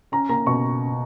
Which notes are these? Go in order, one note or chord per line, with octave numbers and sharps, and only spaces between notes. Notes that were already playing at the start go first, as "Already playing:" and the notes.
C#4 A#5
A#3 A#5
B2 C#6